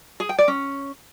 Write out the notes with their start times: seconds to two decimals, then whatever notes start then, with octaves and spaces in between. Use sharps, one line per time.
0.20 G#4
0.29 G5
0.38 D5
0.48 C#4